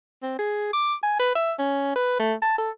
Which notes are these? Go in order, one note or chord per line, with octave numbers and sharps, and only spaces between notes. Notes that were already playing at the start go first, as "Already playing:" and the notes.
C4
G#4
D6
G#5
B4
E5
C#4
B4
A3
A5
A4